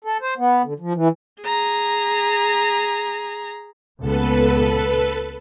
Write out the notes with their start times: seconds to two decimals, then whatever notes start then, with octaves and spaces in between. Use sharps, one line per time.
0.04 A4
0.21 C5
0.38 B3
0.64 D3
0.80 F3
0.95 E3
1.42 G#4 A#5
4.00 C#2 A#2 B3 A4 B4